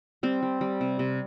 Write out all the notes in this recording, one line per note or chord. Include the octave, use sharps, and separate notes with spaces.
G3 C4
G3
G3
C3
C3